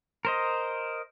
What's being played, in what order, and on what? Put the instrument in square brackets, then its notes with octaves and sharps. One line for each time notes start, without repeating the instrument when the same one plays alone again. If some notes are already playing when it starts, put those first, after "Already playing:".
[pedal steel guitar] A#4 C5 D#5